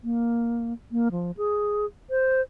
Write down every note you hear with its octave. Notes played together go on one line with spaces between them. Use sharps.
A#3
A#3
F3
G#4
C5